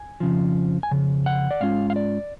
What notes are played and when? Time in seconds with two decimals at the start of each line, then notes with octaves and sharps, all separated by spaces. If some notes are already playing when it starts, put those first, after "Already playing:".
Already playing: G#5
0.20 F2 C#3 F3
0.83 G#5
0.91 F2 C#3
1.26 F#5
1.51 D5
1.60 G#2 G#3 C#4 F4 F5
1.90 F5
1.96 D5